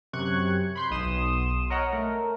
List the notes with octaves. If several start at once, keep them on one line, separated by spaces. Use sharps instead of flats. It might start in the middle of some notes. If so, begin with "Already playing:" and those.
F#2 C3 C#6 F#6 G#6
B5 C6 G6
B1 B2 C6 D#6 E7
A#4 C#5 D#5 F#5
A3 A#4